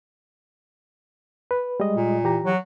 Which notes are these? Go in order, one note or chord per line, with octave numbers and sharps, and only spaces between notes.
B4
G3 G#3 D#5
A#2
E3 G4 A#5
F#3